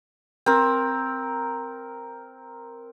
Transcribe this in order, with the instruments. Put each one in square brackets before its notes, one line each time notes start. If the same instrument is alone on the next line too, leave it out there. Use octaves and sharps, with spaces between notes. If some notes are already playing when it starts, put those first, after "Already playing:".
[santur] C4 A#4